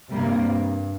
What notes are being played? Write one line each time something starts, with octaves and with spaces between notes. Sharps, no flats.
G2 C3 G3 A#3